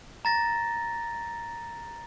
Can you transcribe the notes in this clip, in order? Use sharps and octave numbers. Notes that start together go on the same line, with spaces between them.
A#5 A6 A#6